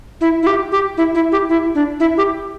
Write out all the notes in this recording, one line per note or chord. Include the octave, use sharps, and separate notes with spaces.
E4
E4
G4
G4
E4
E4
G4
E4
D4
E4
G4